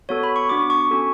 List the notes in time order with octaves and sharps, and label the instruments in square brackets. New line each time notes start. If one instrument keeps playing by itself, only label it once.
[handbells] B3 F#4 A4 C#5
B5
C#6
B3 D4 F#4 D6
C#6
C#4 F#4 A4